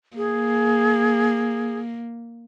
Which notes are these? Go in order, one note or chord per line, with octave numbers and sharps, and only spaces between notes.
A#3 G#4